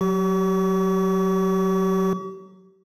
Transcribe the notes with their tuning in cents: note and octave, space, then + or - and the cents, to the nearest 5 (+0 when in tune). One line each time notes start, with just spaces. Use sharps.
F#3 +0 G4 -30 C#6 +45